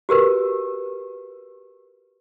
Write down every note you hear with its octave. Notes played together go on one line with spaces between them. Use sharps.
F#4 G4 A#4 B4